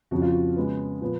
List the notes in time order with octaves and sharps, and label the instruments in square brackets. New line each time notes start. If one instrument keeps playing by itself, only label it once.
[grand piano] F2 C#3 F3 F#4
F4
F#4
C#3 G#3 B3
A#2 F3 B3